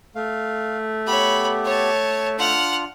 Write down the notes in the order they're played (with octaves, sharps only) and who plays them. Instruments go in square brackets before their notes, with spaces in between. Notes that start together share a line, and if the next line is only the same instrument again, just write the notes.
[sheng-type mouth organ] A3 [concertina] F5
[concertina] B3 G4 [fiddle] C#5 B5
[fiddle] C#5 A5
[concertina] D4 F4 [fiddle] F#5 F6